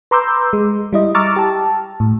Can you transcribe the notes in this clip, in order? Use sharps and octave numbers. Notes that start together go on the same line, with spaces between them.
B4 A#5 C6 D6 E6 G6
G#3
G3 E4 D#5
A#5 C#6 D6 E6 F6 A6
G4 A5
A2